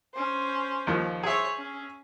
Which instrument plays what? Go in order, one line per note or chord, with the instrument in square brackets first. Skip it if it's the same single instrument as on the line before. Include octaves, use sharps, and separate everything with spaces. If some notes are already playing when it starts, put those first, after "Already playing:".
[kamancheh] C#4 C5
[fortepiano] D#2 D#3 F3
[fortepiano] G#4 E5 [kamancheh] C5 C#5
[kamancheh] C#4